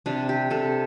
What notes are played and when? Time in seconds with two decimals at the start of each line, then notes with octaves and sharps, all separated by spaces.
0.06 C3 D4
0.29 G4
0.50 C3 A4